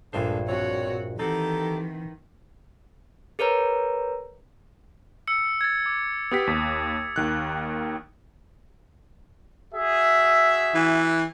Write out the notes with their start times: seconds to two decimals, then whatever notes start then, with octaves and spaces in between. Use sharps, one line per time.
0.13 A#1 G2 D3 G#3 C5
0.48 B2 C4 F#4 C#5
1.19 D#3 E3 C4 D#4 G4 A4 F#5
3.39 G#4 A#4 B4 C#5 A#5
5.28 E6 C#7
5.61 G#6 A6
5.86 D6
6.31 B3 G4 D#6 B6
6.47 D#2
7.16 D#2 D#3 F#6
9.73 F#4 G#4 E5
10.75 E3